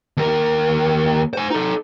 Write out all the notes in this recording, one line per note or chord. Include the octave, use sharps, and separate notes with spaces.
D#2 A#4
C5 G#5
D#4 A4